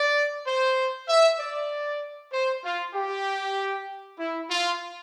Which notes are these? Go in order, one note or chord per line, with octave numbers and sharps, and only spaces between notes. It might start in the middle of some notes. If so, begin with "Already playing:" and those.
Already playing: D5
C5
E5
D5
C5
F4
G4
E4
F4